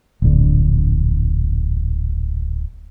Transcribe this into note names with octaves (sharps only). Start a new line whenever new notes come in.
D1 A#1 D3